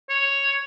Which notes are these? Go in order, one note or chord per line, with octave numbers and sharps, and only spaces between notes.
C#5